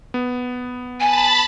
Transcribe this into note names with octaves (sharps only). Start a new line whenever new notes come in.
B3
G#5 A5 B5 A6